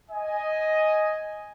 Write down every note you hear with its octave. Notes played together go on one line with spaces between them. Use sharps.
D#5 G#5